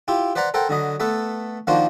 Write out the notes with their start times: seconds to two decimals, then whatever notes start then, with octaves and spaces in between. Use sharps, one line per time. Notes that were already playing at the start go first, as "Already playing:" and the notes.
0.08 E4 F4 G4
0.36 B4 C5 D5 F#5 A#5 B5
0.54 A4 A#4 C5 F#5 G5
0.69 D3 F#3 D#5 B5
1.00 A3 B3 A4 B4
1.67 D#3 F3 A#3 D4 F#4 C5